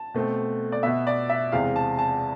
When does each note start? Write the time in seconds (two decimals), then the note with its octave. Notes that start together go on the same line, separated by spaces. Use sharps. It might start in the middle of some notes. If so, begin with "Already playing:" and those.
Already playing: A5
0.14 B2 A3 C4
0.72 D5
0.83 B2 B3 E5
1.07 D5
1.30 E5
1.52 E2 C3 G#3 C4 F5
1.76 A5
1.99 A5